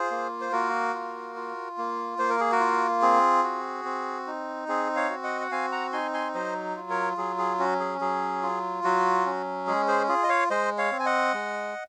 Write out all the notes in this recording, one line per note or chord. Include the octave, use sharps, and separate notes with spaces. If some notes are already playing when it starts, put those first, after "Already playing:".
Already playing: F4 G#4 C5
A#3
C5
A#3 F#4 A#4
F4
F4
A#3
A#3 C5
A#4
G#4
F#4 A#4
F4
C4 G#4
F#4
C4
D#4
C4 G#4
C#5 F5
F#4
D#5 F#5
F#5
C4 F5 G#5
F#5 A#5
D#4 G#5 C6
G#5 C6
F#3 C5 D#5
F4
A#4 C#5
F#3 G#4
G#4
C#4 F#4
G#4
F#3 G#4
F4
F#3 F#4
C#4
G#3 G#4
G#4 C5
F4 G#4
D#5
C#5 F5
G#3 C5 D#5
C#5 F5
C4
G#5
D#5 F#5
G#3